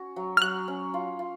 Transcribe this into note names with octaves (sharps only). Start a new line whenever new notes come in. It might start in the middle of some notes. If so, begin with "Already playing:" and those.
Already playing: C#4 F#4
F#3
F6
F#3 F#6
C#4
F4
F4